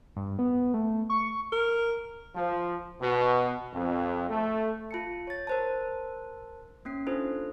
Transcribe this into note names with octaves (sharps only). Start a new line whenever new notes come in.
G2
B3
A3
C#6
A#4
F3
B2
F2
A3
F4 A5 C#7
C#5 A6
A#4 C5 A5
A#3 C#4 C7
D4 D#4 F4 A4 C5